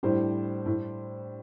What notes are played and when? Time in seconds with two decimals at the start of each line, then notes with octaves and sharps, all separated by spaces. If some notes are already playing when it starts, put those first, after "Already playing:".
0.03 A2 G3 D4 G4 C5
0.66 A2